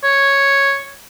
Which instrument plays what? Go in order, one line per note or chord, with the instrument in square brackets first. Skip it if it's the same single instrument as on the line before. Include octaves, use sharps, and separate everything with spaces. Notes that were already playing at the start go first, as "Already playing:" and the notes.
[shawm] C#5